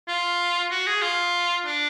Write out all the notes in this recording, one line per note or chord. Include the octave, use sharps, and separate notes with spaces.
F4
F#4
G#4
F4
D4